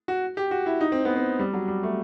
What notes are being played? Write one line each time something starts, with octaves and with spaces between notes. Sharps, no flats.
F#4
G4
F#4
E4
D#4
C4
B3
C4
G3
F#3
G3
A3